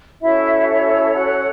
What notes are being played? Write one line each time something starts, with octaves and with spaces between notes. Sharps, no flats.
C#4 E4 F#4 A4 C#5 E5
E4 E5
F#4 F#5